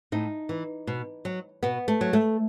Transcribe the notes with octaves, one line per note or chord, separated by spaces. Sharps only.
A2 D#4
E3
B2
F#3
B2 B3
A3
F#3
A3